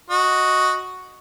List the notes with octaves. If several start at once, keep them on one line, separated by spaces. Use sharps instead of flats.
F#4 D#5